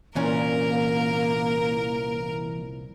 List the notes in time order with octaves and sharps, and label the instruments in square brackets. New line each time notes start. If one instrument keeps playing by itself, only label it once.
[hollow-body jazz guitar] C2 A#2 C#4 [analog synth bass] E3 [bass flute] A#3 [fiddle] A#4